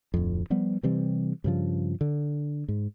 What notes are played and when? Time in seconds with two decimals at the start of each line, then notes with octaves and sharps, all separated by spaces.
0.14 D1 F2
0.50 F3 G3 B3
0.83 C3 E3 G3 C4
1.44 G2 C#3 F3
2.01 D3
2.68 G#2